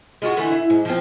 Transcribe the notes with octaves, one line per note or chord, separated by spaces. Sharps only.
G#3 F4 F#4
D3 E3 A3
E4
G#2
F3 C4